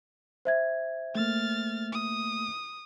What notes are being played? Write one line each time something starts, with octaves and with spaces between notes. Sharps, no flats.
C5 E5 G#6
A3 A#3 F6 A6
D#6